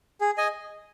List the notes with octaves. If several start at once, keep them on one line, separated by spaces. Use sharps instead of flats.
G#4
D#5 G#5